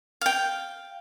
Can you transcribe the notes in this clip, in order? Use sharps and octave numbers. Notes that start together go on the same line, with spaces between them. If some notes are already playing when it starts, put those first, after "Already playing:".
F5 G5